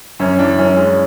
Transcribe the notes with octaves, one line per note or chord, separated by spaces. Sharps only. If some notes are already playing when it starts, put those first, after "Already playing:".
F#2 C#4
E3 D4
F#2 C#4
G#3 C#4